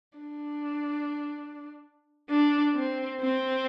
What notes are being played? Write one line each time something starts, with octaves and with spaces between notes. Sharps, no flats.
D4
D4
C4
C4